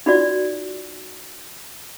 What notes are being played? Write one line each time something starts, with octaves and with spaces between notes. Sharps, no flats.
D#4 F4 F#4 D5